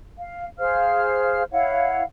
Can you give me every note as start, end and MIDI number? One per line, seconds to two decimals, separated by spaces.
0.18 0.46 77
0.59 1.43 68
0.59 1.43 72
0.59 1.43 77
0.59 1.43 89
1.52 2.03 64
1.52 2.03 73
1.52 2.03 77
1.52 2.03 78